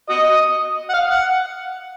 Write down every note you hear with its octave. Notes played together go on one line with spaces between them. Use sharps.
F#4 D#5
F#5
F5
F#5